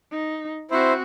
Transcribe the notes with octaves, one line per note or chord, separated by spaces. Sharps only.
D#4
C4 E4 F#4 C5